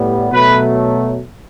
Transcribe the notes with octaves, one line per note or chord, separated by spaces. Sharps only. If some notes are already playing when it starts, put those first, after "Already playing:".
Already playing: A2 G3 B3
B2 F#3 A3 B4